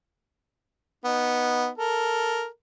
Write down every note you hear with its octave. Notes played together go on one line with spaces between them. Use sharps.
B3 D#4
A4 A#4